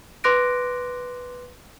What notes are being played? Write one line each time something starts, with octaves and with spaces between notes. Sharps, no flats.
B4 C6 D6 F#6 A#6 D7